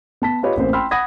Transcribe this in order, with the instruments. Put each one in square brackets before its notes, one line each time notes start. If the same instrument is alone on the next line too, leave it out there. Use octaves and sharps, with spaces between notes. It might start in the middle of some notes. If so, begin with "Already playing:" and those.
[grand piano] B3 A5 B6
F4 G4 B4 C#5 D#5
A1 A#3 C4 C5
G5 B5 C6 E6 F6
F#5 B5 D#6 G#6 A#6